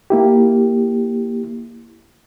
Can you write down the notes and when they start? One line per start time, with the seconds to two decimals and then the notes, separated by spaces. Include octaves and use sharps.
0.10 A#3 E4 G4